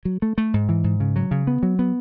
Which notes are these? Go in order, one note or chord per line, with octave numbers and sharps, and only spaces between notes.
F#3
A3
A3
G#2
E3
G#2
C#3
F#3
C#3
B3
F#3
B3